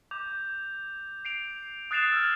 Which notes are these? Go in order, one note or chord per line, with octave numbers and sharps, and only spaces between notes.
D6 G6 F7
C7 D7 F7
D#6 F#6 A6 C7 E7 F7
E6 F6 G#6